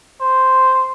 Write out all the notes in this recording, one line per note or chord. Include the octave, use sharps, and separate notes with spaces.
C5